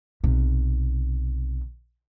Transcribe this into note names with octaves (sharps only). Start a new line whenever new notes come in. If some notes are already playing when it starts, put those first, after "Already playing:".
B1 C3